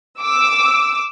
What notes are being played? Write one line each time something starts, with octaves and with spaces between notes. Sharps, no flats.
D6 E6